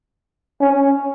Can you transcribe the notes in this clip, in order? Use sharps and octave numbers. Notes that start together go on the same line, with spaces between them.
C#4